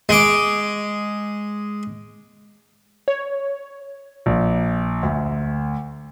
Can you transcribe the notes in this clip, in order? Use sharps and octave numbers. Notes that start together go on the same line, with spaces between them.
G#3 D6
C#5
A#1
D2